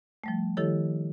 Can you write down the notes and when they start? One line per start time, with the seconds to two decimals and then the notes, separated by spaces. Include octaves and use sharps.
0.24 F3 G3 A3
0.57 D#3 F3 E4 G4 A4 C#5